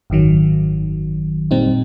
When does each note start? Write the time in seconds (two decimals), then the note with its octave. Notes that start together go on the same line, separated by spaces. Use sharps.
0.10 G#1 F#2 D#3 F#3
1.51 A#2 G3 C4 D#4